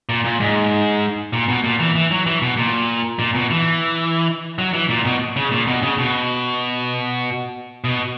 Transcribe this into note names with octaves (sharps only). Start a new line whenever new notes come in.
A#2
A#2
G#2
A#2
B2
A#2
E3
E3
F#3
E3
B2
A#2
A#2
B2
E3
F#3
E3
A#2
B2
C#3
A#2
B2
C#3
B2
B2